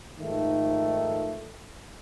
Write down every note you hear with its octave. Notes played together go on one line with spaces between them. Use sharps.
G#2 D#3 F3 A3